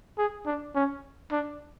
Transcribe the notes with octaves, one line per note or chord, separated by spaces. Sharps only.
G#4
D4
C#4
D4